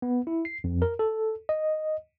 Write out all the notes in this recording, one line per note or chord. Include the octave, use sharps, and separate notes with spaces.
B3
E4
C7
F2
A#4
A4
D#5